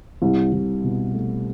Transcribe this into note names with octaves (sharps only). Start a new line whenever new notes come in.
C2
C2
B2
A3